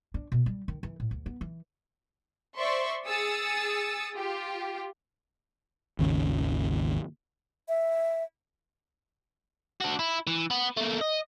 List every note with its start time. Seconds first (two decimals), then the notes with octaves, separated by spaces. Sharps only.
0.14 D4
0.32 B2
0.46 G3
0.68 D#3
0.83 E3
1.00 A2
1.11 D2
1.26 B3
1.41 E3
2.58 C5 D5 E5 C6 C#6
3.07 G#4 D#6 E6 A6 C#7
4.16 F4 G4
5.99 G#1 D#2 C#3
7.68 E5
9.81 D4 F#4
9.99 E4
10.27 E3
10.51 B3
10.77 A3 A#3
11.01 D#5